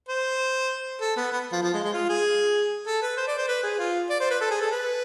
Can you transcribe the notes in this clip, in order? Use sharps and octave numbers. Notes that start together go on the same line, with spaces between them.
C5
A4
B3
B3
F3
F3
G#3
G#3
F4
G#4
A4
B4
C5
D5
C5
B4
G#4
F4
D5
C5
B4
A4
G#4
A4
B4